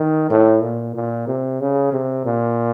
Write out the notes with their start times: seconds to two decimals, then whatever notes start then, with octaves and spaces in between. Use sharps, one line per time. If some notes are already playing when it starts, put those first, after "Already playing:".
Already playing: D#3
0.30 A2
0.62 A#2
0.95 A#2
1.28 C3
1.60 C#3
1.93 C3
2.25 A#2